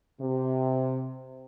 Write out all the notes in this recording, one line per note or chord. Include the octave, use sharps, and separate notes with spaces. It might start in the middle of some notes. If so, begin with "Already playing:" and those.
C3